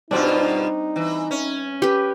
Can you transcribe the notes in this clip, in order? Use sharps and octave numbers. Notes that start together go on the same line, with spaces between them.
G2 B2 G3 C4 D4 D#4 F4
E3
C#4
G4 B4